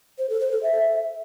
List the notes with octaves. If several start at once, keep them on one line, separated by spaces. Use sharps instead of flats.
C5
A4
C5
A4
E5